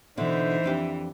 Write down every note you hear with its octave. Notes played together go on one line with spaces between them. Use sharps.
B2 D3 E3 D4 D#4 C5 E5
F2 D4 G4